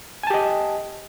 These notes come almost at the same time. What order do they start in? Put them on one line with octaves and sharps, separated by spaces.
G#5 A5 G4 D#5